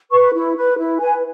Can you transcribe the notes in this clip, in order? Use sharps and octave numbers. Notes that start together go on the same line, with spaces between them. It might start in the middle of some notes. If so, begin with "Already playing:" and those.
B4 C#6
E4
B4
E4
B4 G#5